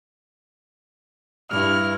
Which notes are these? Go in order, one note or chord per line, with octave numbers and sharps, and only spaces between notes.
G2 E4 F6